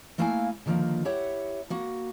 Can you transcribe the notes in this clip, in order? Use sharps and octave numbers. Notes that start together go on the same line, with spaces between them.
A3 A#3 E4 F5 G5 G#5
D3 D#3 F3 G#3 A#3
E4 G4 C#5 E5 F#5
A#3 F#4